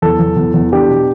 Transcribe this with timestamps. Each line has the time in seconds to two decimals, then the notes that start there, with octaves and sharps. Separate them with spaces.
0.02 E2 A4
0.19 E2
0.37 E2
0.54 E2
0.72 D4 G4
0.89 B2